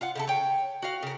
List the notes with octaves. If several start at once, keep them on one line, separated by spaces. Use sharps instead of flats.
F4 F5 F#5
C#3 E4 A4
C#5 G5
F#4 F5
C#3 A#4